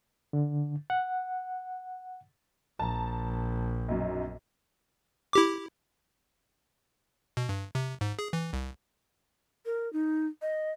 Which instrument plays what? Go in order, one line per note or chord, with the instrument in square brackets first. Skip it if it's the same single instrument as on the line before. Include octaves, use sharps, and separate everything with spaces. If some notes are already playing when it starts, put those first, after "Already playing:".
[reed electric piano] D3
F#5
[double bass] A#1 [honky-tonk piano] A5 A#5
[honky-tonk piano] B1 F#2
[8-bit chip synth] E4 G4 D6
B2
G2
C3
G#2
G#4
E3
C2
[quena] A#4
D#4
D#5